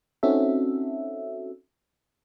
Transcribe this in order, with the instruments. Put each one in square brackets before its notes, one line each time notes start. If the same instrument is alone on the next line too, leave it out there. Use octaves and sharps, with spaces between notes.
[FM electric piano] C4 C#4 D#4 F#4 A4 E5